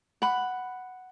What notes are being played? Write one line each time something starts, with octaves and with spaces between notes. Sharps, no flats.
F#5 B5